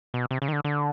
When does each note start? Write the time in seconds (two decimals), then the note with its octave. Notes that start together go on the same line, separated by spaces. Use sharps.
0.14 B2
0.31 C3
0.42 C#3
0.48 D#3
0.53 D3
0.64 D3